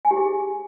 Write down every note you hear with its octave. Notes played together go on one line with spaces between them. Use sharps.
G#5
G4
G#4